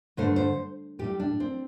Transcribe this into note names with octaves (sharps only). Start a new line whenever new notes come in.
G2 D3 A3 C5
C5
A2 G3 G4
D4
C4